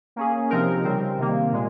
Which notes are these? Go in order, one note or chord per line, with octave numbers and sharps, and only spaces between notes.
A#3 C#4 G#4
C3 F3 C4 D#4 A#4
C#3 G3 C4
C3 D#3 A#3
A#2 G#3